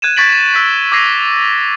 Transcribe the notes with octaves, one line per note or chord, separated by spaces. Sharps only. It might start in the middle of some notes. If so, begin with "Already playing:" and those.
F#6 G#6 D#7 E7
C#6 G#6 A6 B6 D7 F#7
E6 F#6 B6
D6 E6 G#6 A#6 C7 D#7